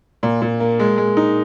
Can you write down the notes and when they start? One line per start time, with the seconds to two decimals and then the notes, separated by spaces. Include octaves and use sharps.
0.23 A#2
0.42 A#2
0.60 A#3
0.80 G#3
0.98 G#3
1.17 D#4